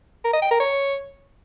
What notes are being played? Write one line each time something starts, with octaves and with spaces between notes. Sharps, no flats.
A#4
D#5
G5
A#4
C#5